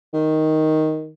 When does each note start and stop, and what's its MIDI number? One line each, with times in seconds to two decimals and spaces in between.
0.14 1.11 51